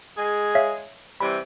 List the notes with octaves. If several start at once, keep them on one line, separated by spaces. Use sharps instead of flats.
G#3 G#4
C#5 E5 F5
C3 E3 G3 B5